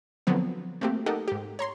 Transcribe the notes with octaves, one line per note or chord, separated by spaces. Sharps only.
D3 F3 F#3 B3 C4
A3 A#3 C4 F#4 G4
D#4 G4 A4 A#4 D#5 F#5
G#2 G4
C#5 A#5 C6